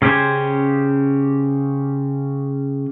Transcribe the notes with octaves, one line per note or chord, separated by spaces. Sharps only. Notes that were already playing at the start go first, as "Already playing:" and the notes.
C#3 C#4 G4 C5 G#5